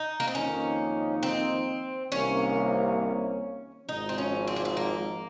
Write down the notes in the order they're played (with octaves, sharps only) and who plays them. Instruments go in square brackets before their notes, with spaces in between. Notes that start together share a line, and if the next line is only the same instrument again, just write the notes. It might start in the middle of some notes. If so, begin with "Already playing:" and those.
Already playing: [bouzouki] D#4
A#3
C4
[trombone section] F2 D#3 A#3 D#4 [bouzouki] C#4
[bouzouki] C4
[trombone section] C2 C3 D#3 A#3 [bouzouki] C#4
[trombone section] G#1 G#2 F3 [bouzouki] D#4
[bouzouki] C4
C#4
C4
A#3
C4
A#3